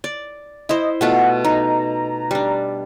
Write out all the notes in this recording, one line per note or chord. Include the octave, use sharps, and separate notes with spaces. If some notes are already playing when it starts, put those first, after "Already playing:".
D5
E4 C5 D#5
B2 A3 F4 F#5
D#4 A#5
G3 D4